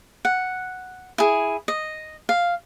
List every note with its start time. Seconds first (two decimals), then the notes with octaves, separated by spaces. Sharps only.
0.25 F#5
1.18 E4 G#4
1.68 D#5
2.29 F5